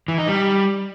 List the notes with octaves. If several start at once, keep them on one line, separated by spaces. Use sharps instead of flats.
E3
D#4
G3